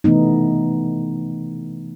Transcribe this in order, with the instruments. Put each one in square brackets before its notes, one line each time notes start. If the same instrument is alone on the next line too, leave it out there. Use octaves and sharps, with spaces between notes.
[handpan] C3 E3 A3 B3 D#4